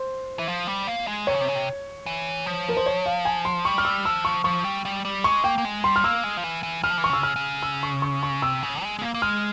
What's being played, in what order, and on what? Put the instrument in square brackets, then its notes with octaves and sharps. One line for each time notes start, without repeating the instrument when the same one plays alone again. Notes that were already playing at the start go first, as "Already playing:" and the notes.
Already playing: [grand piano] C5
[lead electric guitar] E3
F3
G3
A#3
G#3
[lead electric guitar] C3 [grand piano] C#5
[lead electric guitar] C#3
C3
C#3
C3
E3
F3
[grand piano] A#4
C5
C#5
F5
G#5
C6
[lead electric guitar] G3 [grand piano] C#6
[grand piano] F6
E6
[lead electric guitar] F3 [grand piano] E6
[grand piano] C#6
[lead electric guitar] F3 [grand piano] C#6
[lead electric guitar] G3
G3
G3
[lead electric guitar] G#3 [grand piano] C#6
[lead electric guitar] A#3 [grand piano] G5
[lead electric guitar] A#3
G#3
[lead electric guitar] G3 [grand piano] C6
[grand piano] F6
[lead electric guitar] A#3 [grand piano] E6
[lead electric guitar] G#3
F3
E3
E3
[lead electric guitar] E3 [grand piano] F6
[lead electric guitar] F3
E3
[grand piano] C#6
[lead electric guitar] C#3 [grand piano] E6
[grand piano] F6
[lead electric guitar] C#3
[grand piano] E6
C#6
C#6
C#6
[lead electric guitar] C3 [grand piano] E6
[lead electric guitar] C#3
G#3
G#3
A#3
A#3
[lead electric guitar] G#3 [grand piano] F6